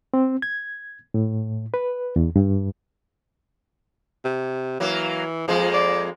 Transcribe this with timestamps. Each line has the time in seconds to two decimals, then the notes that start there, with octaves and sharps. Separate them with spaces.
0.14 C4
0.42 G#6
1.14 A2
1.74 B4
2.16 E2
2.36 G2
4.25 C3
4.80 E3 F#3 A#3
5.48 F2 F3 G#3 A#3
5.74 D5